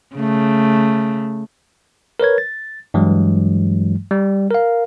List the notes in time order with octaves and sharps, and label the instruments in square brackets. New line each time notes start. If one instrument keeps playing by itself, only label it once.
[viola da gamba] C#3 A3
[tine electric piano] A#4 B4 C#5 G#6
A6
G2 E3 F#3 G#3
G3
A#4 F5